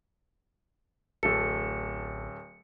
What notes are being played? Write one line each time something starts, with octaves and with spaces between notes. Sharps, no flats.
D1 A1 A4 C#7